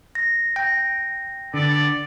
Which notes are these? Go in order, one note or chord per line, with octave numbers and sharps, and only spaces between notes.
A#6
G5 A#6
D3 B3 A4 D5